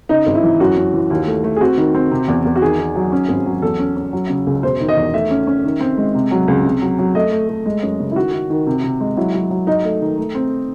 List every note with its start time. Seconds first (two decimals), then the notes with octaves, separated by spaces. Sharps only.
0.09 C#3 D#4
0.26 G#1
0.35 E4
0.43 E3
0.60 F#2 F#4
0.77 F#2
0.94 E3
1.10 D#2
1.27 A3
1.44 A3
1.56 G#4
1.61 C4 F#4
1.77 D#3
1.95 C4
2.11 C3
2.28 E2
2.45 E2
2.56 F#4
2.61 D#3 G#4
2.78 D#3
2.96 F#3
3.12 C#4
3.29 G#1
3.46 F#3
3.62 E2 A4
3.79 C#4
3.96 C#4
4.13 F#3
4.29 C#3
4.46 C#2
4.63 E1 C5
4.80 D#3
4.89 D#5
4.97 E2
5.14 A3 E5
5.30 C#4
5.47 C#4
5.64 D#3
5.81 C4
5.97 G#3
6.15 C3
6.31 F#3
6.48 C#2
6.65 C3
6.81 F#3
6.99 F#3
7.15 A3 D#5
7.32 A3
7.49 A3
7.66 G#3
7.83 F#2
7.99 C#3
8.11 E4
8.16 D#3 F#4
8.33 D#3
8.50 D#3
8.67 C3
8.84 C3
9.00 G#3
9.17 F#3 E4
9.34 F#3
9.51 F#3
9.67 G#2 D#4
9.85 A3
10.01 D#3
10.18 A3
10.35 C4